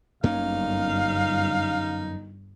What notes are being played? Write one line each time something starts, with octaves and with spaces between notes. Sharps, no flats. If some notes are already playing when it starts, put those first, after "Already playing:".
G1 F#2 A#3 C#4 D#4 F5